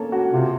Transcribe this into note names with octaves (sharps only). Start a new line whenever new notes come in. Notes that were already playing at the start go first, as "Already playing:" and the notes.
Already playing: A#3 C#4 A4
F#4
C3 F4